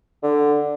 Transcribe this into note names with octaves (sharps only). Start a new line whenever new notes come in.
D3